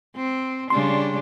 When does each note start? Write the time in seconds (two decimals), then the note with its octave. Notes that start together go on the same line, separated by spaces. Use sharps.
0.16 C4
0.70 C#3 G3 D4 C6